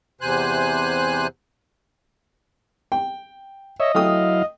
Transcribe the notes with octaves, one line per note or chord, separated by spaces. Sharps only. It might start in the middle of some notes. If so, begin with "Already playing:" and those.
E2 C3 C5 G#5 F#6
G5
C#5 D#5 E5
F#3 A3 E4 F5 G5 D#6